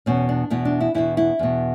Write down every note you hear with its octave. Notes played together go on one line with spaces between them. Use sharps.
E2 B2 C#4
D4
E2 B2 E4
D4
E4
E2 B2 E4
E4
E2 B2